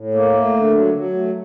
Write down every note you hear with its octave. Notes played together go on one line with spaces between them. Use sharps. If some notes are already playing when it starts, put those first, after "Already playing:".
Already playing: A2
A#3
A3
D3
F#3
F#3
A3